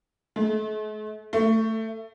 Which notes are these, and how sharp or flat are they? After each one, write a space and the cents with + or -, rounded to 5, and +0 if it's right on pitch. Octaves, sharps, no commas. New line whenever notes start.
A3 -45
A3 +15